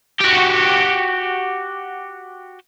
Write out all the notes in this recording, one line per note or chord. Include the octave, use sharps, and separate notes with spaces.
F#4 G4